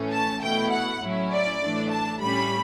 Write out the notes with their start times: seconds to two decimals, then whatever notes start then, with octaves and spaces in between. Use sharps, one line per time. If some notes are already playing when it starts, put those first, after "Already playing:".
Already playing: A2 E3 A3 C#4
0.13 A5
0.42 B2 A3 E4 G5
0.71 F#5
1.01 A2 F#3 C#4 E4
1.31 D5
1.61 A2 E3 A3 D4
1.90 A5
2.20 A2 G3 C#4 B5